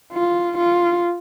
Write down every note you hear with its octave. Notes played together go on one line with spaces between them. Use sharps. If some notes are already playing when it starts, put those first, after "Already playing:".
F4
F4